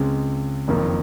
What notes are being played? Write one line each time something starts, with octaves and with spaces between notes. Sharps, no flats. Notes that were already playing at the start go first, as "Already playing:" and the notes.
Already playing: C#2 C#3 G#3 C4
F#1 F2 D#3 A#3